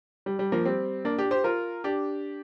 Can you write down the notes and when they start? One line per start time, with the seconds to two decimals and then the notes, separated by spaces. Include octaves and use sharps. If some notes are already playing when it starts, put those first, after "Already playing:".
0.26 G3
0.39 G3
0.52 F3 A#3
0.66 G3 C4
1.05 A#3 D4
1.18 D4 G4
1.31 G4 C5
1.44 F4 A#4
1.84 D4 G4